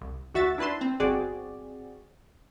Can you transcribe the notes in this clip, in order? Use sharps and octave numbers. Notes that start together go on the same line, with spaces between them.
C2
D2 F#4 E5 A6
D4 E4 B4 A5 C6
C4
G1 C4 F#4 G#4 D5